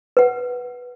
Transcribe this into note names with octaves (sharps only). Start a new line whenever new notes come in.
B4 F#5